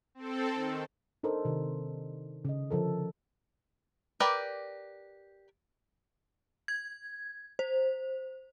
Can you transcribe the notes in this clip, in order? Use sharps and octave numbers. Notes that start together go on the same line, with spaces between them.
C4 A4
D#3
D4 D#4 A4 A#4 C5
C3 D#3
C#3 D#5
D3 F3 A4 A#4
G4 A#4 B4 D5 G5
G#6
C5